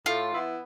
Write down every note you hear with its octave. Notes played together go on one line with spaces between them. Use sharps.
A2 F4
E3 B3 E4